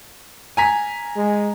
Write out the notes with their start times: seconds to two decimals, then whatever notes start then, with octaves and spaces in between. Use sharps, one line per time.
0.57 G#5 A#5 B6
1.16 G#3